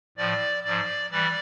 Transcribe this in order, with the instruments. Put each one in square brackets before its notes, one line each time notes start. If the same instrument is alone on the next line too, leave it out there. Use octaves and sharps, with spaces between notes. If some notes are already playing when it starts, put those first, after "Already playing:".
[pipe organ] A2 F3 D5
G#2 F3 D5
E3 G3 D5